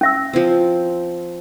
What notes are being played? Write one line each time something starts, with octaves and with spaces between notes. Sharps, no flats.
C#4 E5 E6
F3 C4